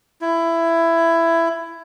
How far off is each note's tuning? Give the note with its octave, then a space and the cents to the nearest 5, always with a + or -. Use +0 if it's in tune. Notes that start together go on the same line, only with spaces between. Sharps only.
E4 +15